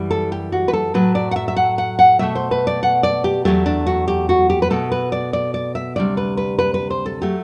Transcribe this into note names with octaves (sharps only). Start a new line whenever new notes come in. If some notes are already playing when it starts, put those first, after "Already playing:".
Already playing: F#2 E3 G3
A4
G4
F#4
B4
A4
A2 F#3 A3 B4
D5
F#5
E5
E5
F#5
F#5
F#5
B2 A3 E5
C5
B4
D5
F#5
D5
G4
E2 C3 F#3 A3 G4
D4
F#4
G4
F#4
G4
B4
B2 A3 A4
B4
D5
D5
D5
E5
D2 C3 G3 D5
B4
B4
B4
B4
C5
A4
F#3 A3 G4